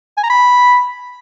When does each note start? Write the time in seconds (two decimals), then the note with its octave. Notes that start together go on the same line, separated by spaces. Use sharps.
0.17 G#5
0.24 A#5
0.30 B5